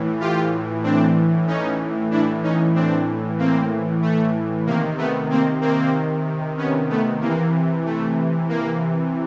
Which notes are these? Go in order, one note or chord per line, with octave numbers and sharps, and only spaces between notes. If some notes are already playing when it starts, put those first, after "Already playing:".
Already playing: A2 E3
F4 G4
C4 D4
C#4 D#4
A2 E3 D4 E4
C#4 D#4
C4 D4
A#3 C4
A3
C3 D#3 A#3
A3 B3
A#3 C4
A#3 C4
B3 C#4
A3 B3
C3 E3 A#3
A3
A#3